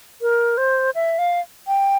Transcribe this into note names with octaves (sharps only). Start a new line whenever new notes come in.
A#4
C5
E5
F5
G5